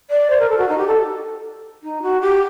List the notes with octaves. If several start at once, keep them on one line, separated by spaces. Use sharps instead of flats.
D5
C5
A#4
A4
F#4
D#4
G4
A4
D#4
F#4
G4